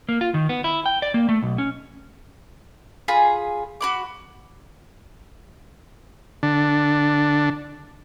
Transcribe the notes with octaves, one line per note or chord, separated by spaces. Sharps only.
A#3
F4
D#3
B3
E4
G5
D5
A#3
A3
B1
C#4
F4 G#4 B5
F#4 B5 D6
D3 D4